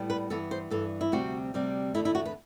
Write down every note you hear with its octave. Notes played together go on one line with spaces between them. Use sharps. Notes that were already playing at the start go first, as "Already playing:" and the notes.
Already playing: A2 G3 B3
B4
G2 E3 B3 A4
C5
G2 E3 B3 A4
E4
D2 C3 G3 C4 F#4
D2 C3 G3 C4
E2 D3 A3 E4
E4
F#4
B4